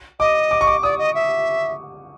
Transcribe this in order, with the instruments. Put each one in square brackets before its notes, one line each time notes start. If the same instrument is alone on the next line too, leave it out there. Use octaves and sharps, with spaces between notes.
[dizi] D#5 [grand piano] D6
[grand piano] D6
C#6
D6
[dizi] D5 [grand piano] D#6
[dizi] D#5
E5